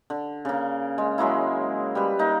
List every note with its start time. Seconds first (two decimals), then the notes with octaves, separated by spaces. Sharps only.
0.10 D3
0.45 C#3 A#3
0.98 G#3
1.18 F#3 G#3 A#3 E4
1.95 G3 B4
2.19 A#3 D#4